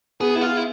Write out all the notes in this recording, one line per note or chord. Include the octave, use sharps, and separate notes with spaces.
B3 G#4
E4
F4
E4